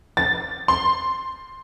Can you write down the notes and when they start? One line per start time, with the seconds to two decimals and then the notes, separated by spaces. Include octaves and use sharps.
0.17 A6
0.68 C6